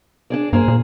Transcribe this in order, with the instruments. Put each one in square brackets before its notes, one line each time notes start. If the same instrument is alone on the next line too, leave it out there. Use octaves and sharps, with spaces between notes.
[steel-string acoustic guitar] D4 G#4 D5
[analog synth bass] G2 [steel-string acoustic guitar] A#3 G#4 C5
[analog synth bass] A#2